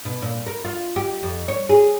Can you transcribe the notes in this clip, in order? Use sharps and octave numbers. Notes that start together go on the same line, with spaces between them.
B2
A#2
A#4
F4
G4
F2
C#5
G#4